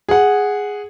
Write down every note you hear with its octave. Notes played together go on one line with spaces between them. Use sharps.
G#4 F#5